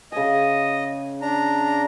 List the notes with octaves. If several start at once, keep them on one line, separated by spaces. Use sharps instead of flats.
C#3 D#5 G#5
D4 A#5